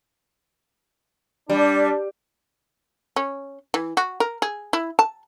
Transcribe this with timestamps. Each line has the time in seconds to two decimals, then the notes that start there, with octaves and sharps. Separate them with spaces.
1.50 G3 D4
3.16 C#4
3.74 E3
3.97 F#4
4.20 A#4
4.42 G#4
4.73 E4
4.99 A5